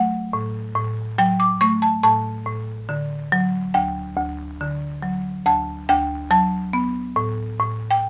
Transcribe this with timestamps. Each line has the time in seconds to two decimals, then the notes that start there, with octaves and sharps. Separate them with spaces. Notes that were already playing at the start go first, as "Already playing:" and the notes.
Already playing: F#3 A3 F#5
0.33 A2
0.75 A2
1.18 F#3 G5
1.40 D6
1.61 A3 C#6
1.82 A5
2.03 A2 A5
2.46 A2
2.89 D3
3.32 F#3
3.74 D2 G5
4.17 D2
4.61 D3
5.02 F#3
5.46 D2 A5
5.89 D2 G5
6.31 F#3 A5
6.73 B3
7.16 A2
7.60 A2
7.91 G5